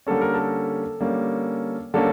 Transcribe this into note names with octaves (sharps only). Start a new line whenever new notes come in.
D3 G3 A#3 C#4 A4
A#4
A4
D3 G3 A#3 C#4
D3 G3 A#3 C#4 A4